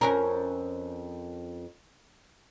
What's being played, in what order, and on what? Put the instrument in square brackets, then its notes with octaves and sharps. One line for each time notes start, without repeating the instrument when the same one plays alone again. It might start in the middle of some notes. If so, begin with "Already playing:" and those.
[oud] F2 C#4 A#4